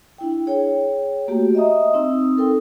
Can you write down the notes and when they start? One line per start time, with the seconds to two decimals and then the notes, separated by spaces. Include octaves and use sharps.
0.18 D4 E4 G5
0.47 G#4 C#5 G5
1.28 A3 A#3 F#4 G4
1.55 D#5 E5 A#5 D#6
1.94 C4 D#4 D#6 E6
2.37 A4 A#4 G5